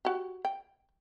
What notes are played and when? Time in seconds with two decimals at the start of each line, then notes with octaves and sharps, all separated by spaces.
0.05 F#4 G4
0.45 G5